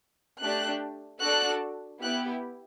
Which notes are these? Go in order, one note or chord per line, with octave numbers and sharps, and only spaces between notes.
A3 D4 G4 F#6
D4 F#4 A4 F#6
B3 E4 G4 F#6